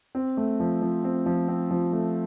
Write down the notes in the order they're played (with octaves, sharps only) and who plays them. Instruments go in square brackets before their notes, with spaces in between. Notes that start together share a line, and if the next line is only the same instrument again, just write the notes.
[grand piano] C4
A3
F3
F3
C4
F3
C4
F3
A3